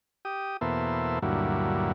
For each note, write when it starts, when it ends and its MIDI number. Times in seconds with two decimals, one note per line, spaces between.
0.25 0.57 67
0.25 0.57 87
0.61 1.19 40
0.61 1.19 47
0.61 1.19 58
0.61 1.19 69
0.61 1.19 72
0.61 1.19 76
1.22 1.92 38
1.22 1.92 43
1.22 1.92 46
1.22 1.92 54
1.22 1.92 64